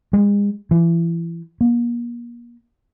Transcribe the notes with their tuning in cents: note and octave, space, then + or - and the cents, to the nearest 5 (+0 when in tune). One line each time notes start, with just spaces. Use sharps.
G#3 -35
E3 +30
A#3 +35